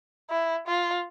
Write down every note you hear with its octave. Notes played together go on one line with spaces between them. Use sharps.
E4
F4